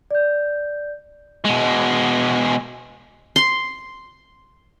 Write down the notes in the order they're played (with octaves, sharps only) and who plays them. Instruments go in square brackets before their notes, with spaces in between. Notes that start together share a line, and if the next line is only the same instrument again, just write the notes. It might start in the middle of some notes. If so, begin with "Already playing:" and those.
[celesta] D5 G6
[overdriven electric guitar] B2 G#3
[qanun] C6